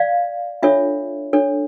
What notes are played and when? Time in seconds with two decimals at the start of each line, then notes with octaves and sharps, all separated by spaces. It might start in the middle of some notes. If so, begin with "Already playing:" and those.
Already playing: D5 F5
0.63 D4 F4 A4 C#5 E5
1.33 D4 A4 C#5